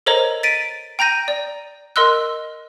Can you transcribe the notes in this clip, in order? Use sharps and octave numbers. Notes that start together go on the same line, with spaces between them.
A4 A#4 C5 C#5 D#5 A#5
A6 B6 D7 D#7
G5 A#5 G6 A#6 D#7
D5
A#4 D#5 C6 E6 F#6